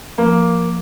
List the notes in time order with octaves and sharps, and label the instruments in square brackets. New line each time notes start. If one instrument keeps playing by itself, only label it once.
[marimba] F3 [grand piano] A#3